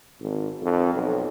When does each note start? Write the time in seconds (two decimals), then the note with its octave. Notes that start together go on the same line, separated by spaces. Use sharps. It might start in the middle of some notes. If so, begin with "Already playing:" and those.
0.21 G#1
0.63 F2
0.94 B1